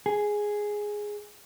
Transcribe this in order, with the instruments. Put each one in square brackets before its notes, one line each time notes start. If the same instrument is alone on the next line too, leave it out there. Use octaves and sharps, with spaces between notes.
[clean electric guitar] G#4